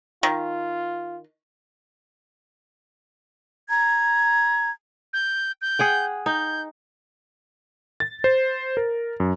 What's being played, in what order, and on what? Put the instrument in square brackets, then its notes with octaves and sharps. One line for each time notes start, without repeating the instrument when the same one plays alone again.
[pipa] D#3 [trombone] F4
[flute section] A#5 G#6
[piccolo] G6
G6
[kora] G#4 F#5 G5
[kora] D#4 [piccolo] G6
[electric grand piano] A6
C5
A#4
F#2